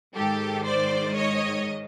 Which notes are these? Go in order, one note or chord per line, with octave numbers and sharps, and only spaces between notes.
G#2 D#3 G4 A4
C5 D5
C#5 D#5